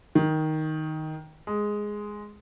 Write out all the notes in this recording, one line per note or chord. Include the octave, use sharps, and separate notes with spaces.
D#3
G#3